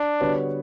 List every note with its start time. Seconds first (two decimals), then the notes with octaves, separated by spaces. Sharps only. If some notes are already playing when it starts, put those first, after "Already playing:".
Already playing: D4
0.20 D3 G3 B3 F#4 C#5